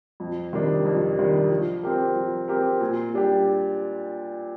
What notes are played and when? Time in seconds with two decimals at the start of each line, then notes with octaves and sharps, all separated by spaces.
0.20 F2
0.53 C3 D#3 G3 D4
0.85 F2
1.18 C3 D#3 G3 D4
1.50 F3
1.83 C4 G4 A#4
2.15 F3
2.48 C4 G4 A#4
2.81 A#2
3.13 G3 D4 G4